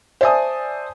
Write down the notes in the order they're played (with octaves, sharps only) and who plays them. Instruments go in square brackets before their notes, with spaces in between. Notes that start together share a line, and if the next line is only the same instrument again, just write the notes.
[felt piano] C5 D5 E5 G#5 A5 D#6